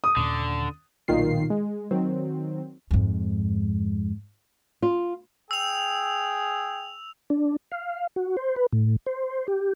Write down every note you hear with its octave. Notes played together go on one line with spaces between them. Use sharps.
D#6
D#2 A#2 D3 C#4
B1 A#2 D#3 F4 C7
G#3
D#3 F#3 C4
F2 G#2
F4
G#4 G5 E6 F7
D4
F5
F#4
C5
B4
A2
C5
G4